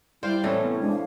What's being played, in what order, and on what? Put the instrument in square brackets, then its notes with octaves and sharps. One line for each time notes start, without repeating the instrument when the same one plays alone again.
[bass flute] G3 [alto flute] E4 [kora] C5 [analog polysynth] D5 F5 G5
[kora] A2 E3 A3 [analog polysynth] C3 C4 C#4 [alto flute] A4
[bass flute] B3
[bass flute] G#3 [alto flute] D4
[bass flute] F5